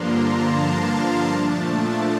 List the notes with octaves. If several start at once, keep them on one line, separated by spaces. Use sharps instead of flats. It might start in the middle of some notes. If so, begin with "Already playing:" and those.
Already playing: G2 D3 F3 A#3 D4 A#5 C6
A5
F5
A5
A5
A#2 F3 A3 D4